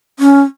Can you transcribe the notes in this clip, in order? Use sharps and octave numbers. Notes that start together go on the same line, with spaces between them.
C#4